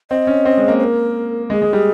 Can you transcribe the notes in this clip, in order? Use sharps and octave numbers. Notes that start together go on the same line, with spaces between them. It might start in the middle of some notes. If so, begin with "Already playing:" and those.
C4 D#5
C#4
C4
G#3
A#3
C5
A#4
G#3 G#4
G#3
G3